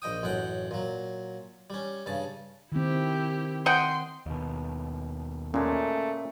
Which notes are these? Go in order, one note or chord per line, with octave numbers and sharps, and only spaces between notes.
A#1 D#5 G5 D#6
A1 F#2 F#5 G5
A#2 F#3
G3 C#4
G2 C#3 A5
D#3 C4 E4 G4
D#5 F#5 G5 C6
D#2 B2
A#2 G#3 A3 C#4